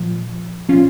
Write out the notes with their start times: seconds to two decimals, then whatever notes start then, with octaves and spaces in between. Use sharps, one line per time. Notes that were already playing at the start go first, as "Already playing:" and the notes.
Already playing: A#2 F3
0.69 A#2 F3 C#4 F4